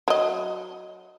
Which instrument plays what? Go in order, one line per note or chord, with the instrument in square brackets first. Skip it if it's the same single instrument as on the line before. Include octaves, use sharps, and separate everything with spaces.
[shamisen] F#3 D#5